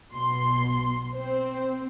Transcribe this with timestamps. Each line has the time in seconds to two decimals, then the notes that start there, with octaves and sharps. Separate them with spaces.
0.13 B1 B2 C6
1.14 C4 C5